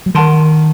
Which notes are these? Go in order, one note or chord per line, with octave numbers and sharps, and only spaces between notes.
F#3
D#3 A#4 F#5 A5 C6